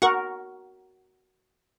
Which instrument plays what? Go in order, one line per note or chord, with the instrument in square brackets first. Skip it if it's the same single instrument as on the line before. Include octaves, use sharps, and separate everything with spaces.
[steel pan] F#4 A#4 [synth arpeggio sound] F#5 C#6